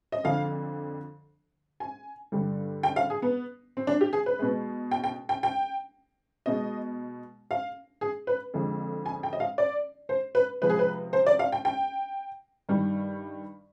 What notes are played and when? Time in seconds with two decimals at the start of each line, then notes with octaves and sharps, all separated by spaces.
0.12 D#5
0.24 F2 D3 F3 F5
1.80 G#5
2.32 G2 D3 G3
2.83 G5
2.96 F5
3.10 G#4
3.22 B3
3.77 C4
3.87 D4
4.01 G4
4.13 G#4
4.26 B4
4.39 B2 G#3
4.91 G5
5.04 G5
5.29 G5
5.43 G5
6.46 B2 G#3 D#5
7.51 F5
8.01 G#4
8.27 B4
8.54 F2 D3 F3 G#3
9.06 G#5
9.23 G5
9.33 D#5
9.40 F5
9.58 D5
10.09 C5
10.35 B4
10.62 C3 F3 G#3 B4
10.70 G#4
10.79 B4
11.13 C5
11.26 D5
11.39 F5
11.52 G5
11.65 G5
12.69 G2 D#3 G3